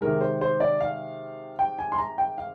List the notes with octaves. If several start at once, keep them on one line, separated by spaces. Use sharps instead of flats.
C3 D#3 G#3 A#4
C5
C5
D5
F5
G5
G#5
C6
A#5
G5
F5